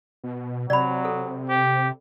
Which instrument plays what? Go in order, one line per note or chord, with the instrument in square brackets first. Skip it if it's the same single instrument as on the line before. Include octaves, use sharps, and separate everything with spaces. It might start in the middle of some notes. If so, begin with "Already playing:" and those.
[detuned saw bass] B2
[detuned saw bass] C3 [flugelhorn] F#3 [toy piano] D5 B5
[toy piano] A4
[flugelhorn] G4